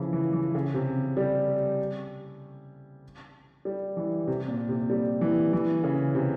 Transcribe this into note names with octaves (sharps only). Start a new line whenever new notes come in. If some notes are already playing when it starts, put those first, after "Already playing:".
Already playing: C#3 E3 F3
E3
E3
C#3
C3
G3
G3
E3
C3
A#2
C3
G3
E3
E3
C#3
C3